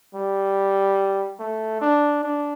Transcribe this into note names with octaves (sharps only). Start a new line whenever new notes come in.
G3
A3
D4
D4